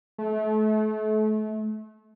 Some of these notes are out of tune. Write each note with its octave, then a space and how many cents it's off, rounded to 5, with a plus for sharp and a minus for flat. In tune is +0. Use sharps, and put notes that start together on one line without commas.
A3 -30